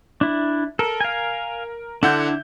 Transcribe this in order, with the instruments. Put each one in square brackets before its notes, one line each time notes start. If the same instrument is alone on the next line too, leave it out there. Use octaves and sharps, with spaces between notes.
[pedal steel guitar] D4 E4
[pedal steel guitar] A4 [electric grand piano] A#4
[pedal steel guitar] F5 G#5
[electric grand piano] D3 F#5 G6 [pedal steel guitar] D4 E4